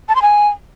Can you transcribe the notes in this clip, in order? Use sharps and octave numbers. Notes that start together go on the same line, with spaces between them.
A5
C6
G#5